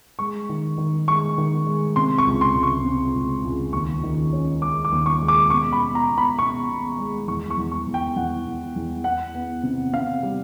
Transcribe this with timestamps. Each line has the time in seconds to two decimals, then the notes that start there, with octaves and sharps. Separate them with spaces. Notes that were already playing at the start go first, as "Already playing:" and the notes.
0.19 G#3 C#6
0.49 D#3
0.78 D#3
1.08 G#3 C#6
1.38 D#3
1.67 G#3
1.96 C3 C6
2.18 C#6
2.26 C#2
2.41 C6
2.55 C#2
2.63 C#6
2.85 C3
3.15 C#2
3.44 C#2
3.73 D#2 C#6
4.03 D#3
4.33 C#4
4.62 G#3 D6
4.85 D6
4.92 D#2
5.06 C#6
5.21 G#3
5.28 D6
5.50 B2 C#6
5.73 B5
5.80 B2
5.95 A#5
6.10 B2
6.18 B5
6.39 B2 C#6
6.69 B2
6.99 G#3
7.28 E2 C#6
7.50 C#6
7.57 E2
7.72 C#6
7.87 E2
7.94 G5
8.16 E2 F#5
8.46 E2
8.76 E2
9.04 B3 F#5
9.35 B3
9.63 C3
9.93 C3 F5
10.23 G3